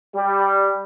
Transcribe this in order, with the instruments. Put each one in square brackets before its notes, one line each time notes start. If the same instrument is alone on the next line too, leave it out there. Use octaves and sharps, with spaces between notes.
[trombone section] G3